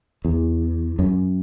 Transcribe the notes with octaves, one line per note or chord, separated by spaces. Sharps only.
E2
F#2